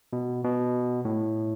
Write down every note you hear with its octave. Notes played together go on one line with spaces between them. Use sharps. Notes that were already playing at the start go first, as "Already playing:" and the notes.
B2
B2
A2